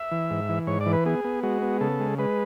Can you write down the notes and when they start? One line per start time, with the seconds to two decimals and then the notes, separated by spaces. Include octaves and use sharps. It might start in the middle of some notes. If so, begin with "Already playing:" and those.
Already playing: E5
0.11 E3
0.30 G#2
0.49 E3
0.67 G#2 C#5
0.81 D5
0.86 E3
0.93 B4
1.05 B3 G#4
1.24 B3
1.43 G#3 F#4
1.62 B3
1.81 C#3 A4
2.00 G#3
2.19 G#3 B4